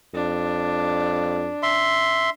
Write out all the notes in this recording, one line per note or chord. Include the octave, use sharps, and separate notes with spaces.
F2 D4
E5 C6